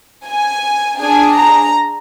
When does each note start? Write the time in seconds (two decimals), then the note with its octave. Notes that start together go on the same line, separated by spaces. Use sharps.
0.26 G#5
0.99 D4 G#4 G#5
1.36 A#5